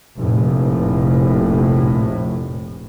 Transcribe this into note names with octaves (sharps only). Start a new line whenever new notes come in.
F1 A#1 A2